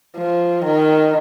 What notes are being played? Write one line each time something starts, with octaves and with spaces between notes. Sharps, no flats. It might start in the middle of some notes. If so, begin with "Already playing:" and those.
F3
D#3